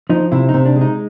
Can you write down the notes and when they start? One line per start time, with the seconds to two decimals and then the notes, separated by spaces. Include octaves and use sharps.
0.10 F3 D#4
0.32 C3 E4
0.49 D#4
0.54 C3
0.66 D4
0.76 G#3
0.81 D#4